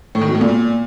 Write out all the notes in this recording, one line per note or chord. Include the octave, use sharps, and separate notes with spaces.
A2
D#3
B2
A2
A#2